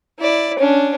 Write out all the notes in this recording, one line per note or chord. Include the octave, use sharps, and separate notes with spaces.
E4 D5
C#4 D4